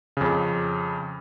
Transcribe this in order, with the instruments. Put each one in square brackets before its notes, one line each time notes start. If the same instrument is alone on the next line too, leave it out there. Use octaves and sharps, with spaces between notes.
[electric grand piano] F2 C#3